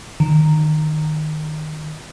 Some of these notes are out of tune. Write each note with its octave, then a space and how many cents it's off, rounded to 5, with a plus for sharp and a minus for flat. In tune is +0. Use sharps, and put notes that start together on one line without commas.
D#3 -15